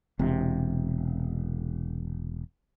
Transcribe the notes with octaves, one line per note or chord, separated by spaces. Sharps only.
E1 C3